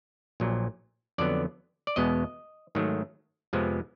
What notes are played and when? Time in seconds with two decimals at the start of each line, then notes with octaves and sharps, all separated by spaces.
0.40 A#1 A#2 F#3
1.18 F2 D3 F#3 B3 D5
1.87 D5
1.96 E2 B2 G#3 B3 D#5
2.75 G#2 D#3 F#3 A3
3.53 F2 C3 F3 G#3 B3